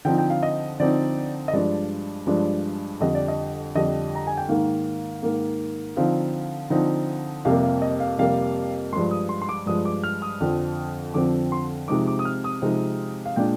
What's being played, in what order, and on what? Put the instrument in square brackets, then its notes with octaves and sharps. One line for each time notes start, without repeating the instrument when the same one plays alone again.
[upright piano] D3 F3 C4 D#4 G5
G5
F5
D#5
D3 F3 C4 D#4 D5
D#5
G2 F3 G#3 D4 D5
G2 F3 G#3 D4
F2 D3 G3 D4 D#5
D5
D#5
F2 D3 G3 D4 D#5
A#5
G#5
G5
G#2 D#3 A#3 F5
G#2 D#3 A#3
D3 F3 C4 D#4 F5
D3 F3 C4 D#4
F2 C3 G3 A#3 F5
F5
D#5
F5
F2 C3 G3 A#3 F5
G2 F3 G#3 C6
D#6
C6
C6
D6
G2 F3 G#3 D#6
D6
F6
D#6
F2 D3 F3 C4
F2 D3 F3 C4 D6
C6
C3 F3 G#3 C4 D#4 D6
D6
D#6
F6
D#6
C3 F3 G#3 C4 D#4
F5
A#2 G#3 D4 G5